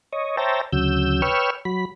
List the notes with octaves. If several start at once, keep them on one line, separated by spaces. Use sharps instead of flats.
C#5 D#5
C5 C#5 E5 G5 A5 A#5
D2 C#3 F#3 E6 G6
B4 C#5 G5 C#6 E6 F6
F#3 B5